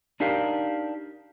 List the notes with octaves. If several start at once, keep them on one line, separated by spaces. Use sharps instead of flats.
D4 D#4 G4 A#4 F5